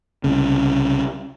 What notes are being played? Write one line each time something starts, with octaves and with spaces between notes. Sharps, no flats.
C2 C#3